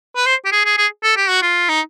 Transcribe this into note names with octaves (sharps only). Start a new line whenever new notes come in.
B4
C5
G4
G#4
G#4
G#4
A4
G4
F#4
F4
D#4